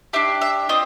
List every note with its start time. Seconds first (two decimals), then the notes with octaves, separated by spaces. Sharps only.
0.13 D4 G4 E5
0.41 E5
0.69 C4 F4 D#5